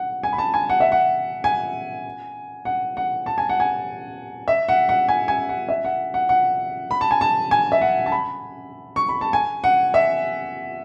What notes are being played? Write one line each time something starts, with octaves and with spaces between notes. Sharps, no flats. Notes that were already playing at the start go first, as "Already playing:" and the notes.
Already playing: F#5
G#5
B5
A5
G#5
F#5
E5
F#5
G#5
F#5
F#5
A5
G#5
F#5
G#5
E5
F#5
F#5
G#5
G#5
F#5
E5
F#5
F#5
F#5
B5
A5
G#5
A5
G#5
E5
F#5
A5
B5
C#6
B5
A5
G#5
F#5
E5